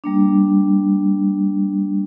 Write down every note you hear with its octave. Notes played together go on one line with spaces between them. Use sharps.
G3 A#3 D4